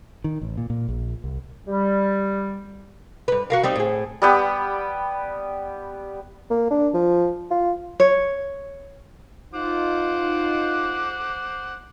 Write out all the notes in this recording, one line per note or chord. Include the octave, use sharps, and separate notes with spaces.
D#3
A1
A#2
A#2
A#1
C2
G3
G2 B4
F#4 A#4 F5
G3 C4 D#4
A2 G#4
G3 B3 G4
A#3
D4
F3
F4
C#5
D#4 F4 C5 F#5 D6